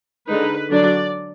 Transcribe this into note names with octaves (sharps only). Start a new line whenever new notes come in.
D3 G#3 D#4 B4
D3 F#3 D4 D5